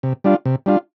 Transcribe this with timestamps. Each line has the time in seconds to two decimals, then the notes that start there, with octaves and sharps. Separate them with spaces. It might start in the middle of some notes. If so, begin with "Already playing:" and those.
0.03 C3
0.24 G3 D4 F4
0.46 C3
0.66 G3 D4 F4